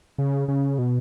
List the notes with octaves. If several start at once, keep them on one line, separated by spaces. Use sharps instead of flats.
C#3
C#3
B2